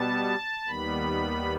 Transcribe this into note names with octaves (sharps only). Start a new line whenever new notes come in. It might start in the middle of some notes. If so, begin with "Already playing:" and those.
Already playing: B2 G3 B3 A5
D#2 D#3 G3 B3 B5